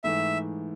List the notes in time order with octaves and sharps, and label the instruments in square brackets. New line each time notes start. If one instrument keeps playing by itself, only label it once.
[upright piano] G#2 E3 A3 [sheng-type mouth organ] E5